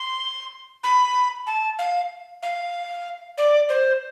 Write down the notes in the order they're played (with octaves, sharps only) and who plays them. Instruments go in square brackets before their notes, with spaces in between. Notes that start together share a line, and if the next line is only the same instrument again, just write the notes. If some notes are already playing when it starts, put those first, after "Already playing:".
Already playing: [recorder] C6
B5
A5
F5
F5
D5
C5